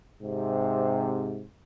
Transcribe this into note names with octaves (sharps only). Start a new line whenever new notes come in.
G#2 C3